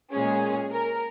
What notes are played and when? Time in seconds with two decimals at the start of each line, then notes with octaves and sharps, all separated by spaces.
0.13 A#2 G#3 C#4 G#4
0.72 A#4